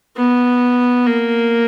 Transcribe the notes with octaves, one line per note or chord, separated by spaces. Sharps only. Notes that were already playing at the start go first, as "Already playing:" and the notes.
B3
A#3